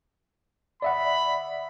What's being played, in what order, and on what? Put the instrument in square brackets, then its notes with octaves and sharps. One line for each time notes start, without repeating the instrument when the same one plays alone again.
[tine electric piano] D5 E5 F#5 [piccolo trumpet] B5